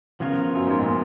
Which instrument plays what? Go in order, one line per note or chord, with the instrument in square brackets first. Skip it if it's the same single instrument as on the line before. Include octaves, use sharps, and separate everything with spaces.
[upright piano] C#3 [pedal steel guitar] F3 B3 F4 A#4 C#5
[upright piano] F#2
G#2
A#2